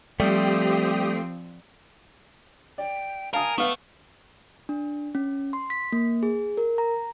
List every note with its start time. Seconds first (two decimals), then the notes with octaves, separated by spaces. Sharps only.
0.20 F3 G3 A3 C4 G4 D#6
2.78 D5 G5
3.33 A#4 F5 G#5 A5 D#6
3.58 A3 B3 F5 D#6
4.69 D4
5.15 C#4
5.53 C6
5.70 B6
5.92 A#3
6.23 G#4
6.57 A#4
6.78 A#5